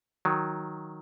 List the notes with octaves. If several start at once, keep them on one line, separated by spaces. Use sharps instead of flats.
D#3 F#3